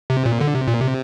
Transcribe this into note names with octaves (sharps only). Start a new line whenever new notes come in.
C3
A#2
D3
C3
A#2
C3